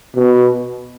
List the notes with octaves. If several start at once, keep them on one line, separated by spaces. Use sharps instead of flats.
B2